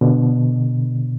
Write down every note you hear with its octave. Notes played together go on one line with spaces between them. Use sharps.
B2 D3